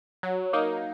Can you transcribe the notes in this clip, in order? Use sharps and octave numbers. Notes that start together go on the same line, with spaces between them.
F#3
A#3 D#4